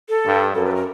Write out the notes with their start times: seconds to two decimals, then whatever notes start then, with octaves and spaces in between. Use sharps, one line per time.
0.09 A4
0.25 G2
0.55 F#2 A4
0.66 B4
0.71 A4
0.76 A#4